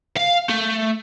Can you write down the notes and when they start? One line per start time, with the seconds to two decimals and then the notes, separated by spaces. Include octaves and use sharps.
0.17 F5
0.50 A3